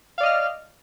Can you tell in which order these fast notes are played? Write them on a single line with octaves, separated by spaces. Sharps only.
F5 D5 D#5 F6